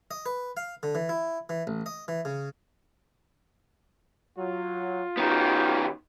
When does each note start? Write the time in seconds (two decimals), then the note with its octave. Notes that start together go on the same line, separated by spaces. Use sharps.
0.11 D#5
0.26 B4
0.57 F5
0.83 D3
0.95 E3
1.09 E4
1.49 E3
1.67 A1
1.86 D#5
2.08 E3
2.25 C#3
4.37 F#3 F4
5.17 D#3 B3 C#4 F#4 G4